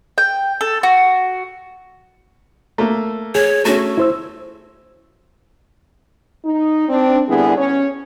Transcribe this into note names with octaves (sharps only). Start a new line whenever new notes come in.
G5
A4
F#4
A3 A#3
G#4 C#5
A3 C#4 F#4
E4 C5 E6
D#4
C4 D4
D3 G3 B3 E4 G#4
C#4 C#5